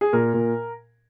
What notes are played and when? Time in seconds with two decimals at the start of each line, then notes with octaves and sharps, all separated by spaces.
0.01 G#4
0.13 A#2 A#4
0.34 A#2